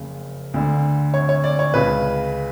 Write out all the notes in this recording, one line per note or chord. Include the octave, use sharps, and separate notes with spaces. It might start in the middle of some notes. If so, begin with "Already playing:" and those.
Already playing: F#1 F2 C#3
D2 D3
C#5
C#5
D5
C#5
C#2 C#3 B4